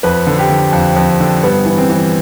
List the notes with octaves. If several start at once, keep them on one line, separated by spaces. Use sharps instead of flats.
F2 B4
D3
G4
D3
F2
F2
D3
G2 B3
E3
C4
E3